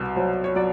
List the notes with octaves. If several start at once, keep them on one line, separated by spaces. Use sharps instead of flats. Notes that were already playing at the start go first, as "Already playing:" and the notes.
Already playing: C2 B2
F#3 C5
C#5
F#3 D5